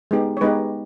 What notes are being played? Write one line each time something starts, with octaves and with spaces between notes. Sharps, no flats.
G#3 B3 D#4 G4
C#5
G#3 B3 D#4 G4 B4 D#5